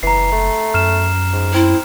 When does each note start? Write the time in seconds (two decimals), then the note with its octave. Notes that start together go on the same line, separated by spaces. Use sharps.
0.03 F#1 E3 A#5 C7
0.32 A3
0.74 F#2 F6 E7
1.33 G#2
1.54 C4 E4